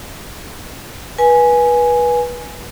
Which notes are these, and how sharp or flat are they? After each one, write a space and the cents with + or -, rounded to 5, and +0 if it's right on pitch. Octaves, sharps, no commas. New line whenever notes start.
B4 -25 G#5 +0